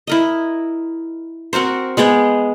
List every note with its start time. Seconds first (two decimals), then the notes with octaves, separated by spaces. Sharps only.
0.07 E4 A#4 D#5
1.53 C4 F#4 A#4 C5
1.97 G#3 B3 G#4 G5